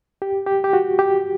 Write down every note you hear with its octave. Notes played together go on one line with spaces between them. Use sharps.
G4
G4
G4
F#4
G4